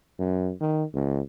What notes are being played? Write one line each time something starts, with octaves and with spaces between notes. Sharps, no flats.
F#2
D#3
C#2